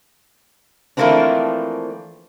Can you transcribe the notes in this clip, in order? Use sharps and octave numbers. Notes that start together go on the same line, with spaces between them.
E3 F3 A3 A#3 C4 D4